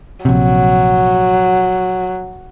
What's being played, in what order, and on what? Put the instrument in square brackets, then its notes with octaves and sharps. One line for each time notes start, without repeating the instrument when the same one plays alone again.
[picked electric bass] A#1 C3 [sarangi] F#3